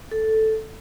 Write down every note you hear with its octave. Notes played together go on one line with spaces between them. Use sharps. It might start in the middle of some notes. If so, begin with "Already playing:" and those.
A4